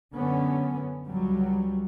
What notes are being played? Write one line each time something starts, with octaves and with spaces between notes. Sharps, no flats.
F#2 D3 B3 C#4
C#2 F#3 G3